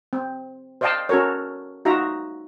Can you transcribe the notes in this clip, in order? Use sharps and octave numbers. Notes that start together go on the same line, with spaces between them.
C4
C5 D5 D#5 F5 G5 A5
C#4 F#4 A4 A#4 C#5
D#4 F4 F#4 E5 A#5